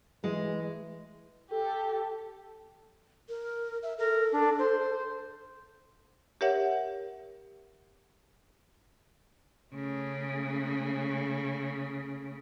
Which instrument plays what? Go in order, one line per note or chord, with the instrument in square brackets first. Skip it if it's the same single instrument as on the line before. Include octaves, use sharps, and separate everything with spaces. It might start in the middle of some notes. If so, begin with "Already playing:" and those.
[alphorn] E3 [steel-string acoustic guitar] G#3
[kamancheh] G4 [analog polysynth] A4
[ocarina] A#4
E5
[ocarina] A4 [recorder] A#4
[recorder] D4
C5
[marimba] G4 A#4 C#5 E5 F#5
[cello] C#3 A3